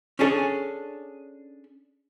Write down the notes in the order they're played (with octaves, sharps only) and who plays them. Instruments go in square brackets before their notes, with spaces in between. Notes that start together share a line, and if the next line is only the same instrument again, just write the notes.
[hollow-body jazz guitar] C#4 D4 G#4 A4 C#5